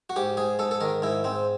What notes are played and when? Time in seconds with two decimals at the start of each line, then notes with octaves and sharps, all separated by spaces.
0.10 F#4
0.16 G#2 G4
0.37 G#2 G#4
0.59 G#2 A4
0.71 A4
0.81 D#3 A#4
1.02 G#2 E4
1.24 G#2 C4